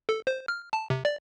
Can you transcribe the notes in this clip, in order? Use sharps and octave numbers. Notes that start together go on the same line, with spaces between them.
A4
C5
F6
A5
C3
D5